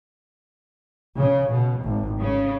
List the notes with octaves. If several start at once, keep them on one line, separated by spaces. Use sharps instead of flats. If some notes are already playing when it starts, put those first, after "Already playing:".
C#3
B2
G#1
C#3